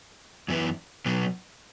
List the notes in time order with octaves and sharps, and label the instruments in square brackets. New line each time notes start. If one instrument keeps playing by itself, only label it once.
[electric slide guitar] F#2 E3 B3 E4
B2 F#3 B3